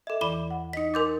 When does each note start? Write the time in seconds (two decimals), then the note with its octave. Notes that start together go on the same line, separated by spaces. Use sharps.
0.07 A4 D#5 E5
0.21 E2 E3 D5 B5 D6 G7
0.51 F#5
0.73 D#4 D#5 B6 C#7
0.94 A#4 G#5 C6 D6 G6 A6